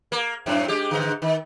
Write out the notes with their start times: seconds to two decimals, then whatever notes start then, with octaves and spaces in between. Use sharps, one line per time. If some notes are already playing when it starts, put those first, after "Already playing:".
0.12 A#3
0.46 F#2 A2 C4
0.68 G#3 G4
0.91 G#2 D3
1.22 D#3